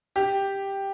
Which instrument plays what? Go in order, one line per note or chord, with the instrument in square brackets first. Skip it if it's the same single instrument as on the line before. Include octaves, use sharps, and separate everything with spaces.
[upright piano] G4